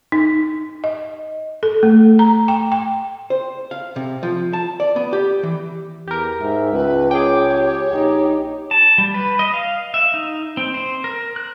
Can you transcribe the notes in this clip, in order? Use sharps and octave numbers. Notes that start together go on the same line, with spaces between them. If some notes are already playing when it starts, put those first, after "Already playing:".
D#4
D#5
A4
A3
A#5
G5
G5
C5
F5
C3
F3
A5
D5
B3
G4
E3
E2 G4 A#4
G#2 E5
C#2 B4
G#4 C#5 G5 D6
G4
A#1 D#4 G4
A5
G3
B4
D#5
F5
E5
D#4
C4
C5
A#4
F#6